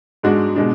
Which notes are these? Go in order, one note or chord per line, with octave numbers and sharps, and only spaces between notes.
G#2 G#3 D4 F#4
B2 G#3 D4